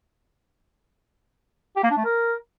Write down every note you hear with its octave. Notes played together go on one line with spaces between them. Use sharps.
G4
A#3
D4
A3
A#4